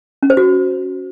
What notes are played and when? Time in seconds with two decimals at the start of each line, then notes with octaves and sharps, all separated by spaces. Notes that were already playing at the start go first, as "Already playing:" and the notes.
0.23 C#4
0.30 C5
0.37 F#4